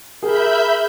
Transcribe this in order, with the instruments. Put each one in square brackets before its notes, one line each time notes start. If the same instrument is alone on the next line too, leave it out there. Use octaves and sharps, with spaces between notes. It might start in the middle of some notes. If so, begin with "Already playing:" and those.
[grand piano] G#4 [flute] A#4 [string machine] E5 B5 G6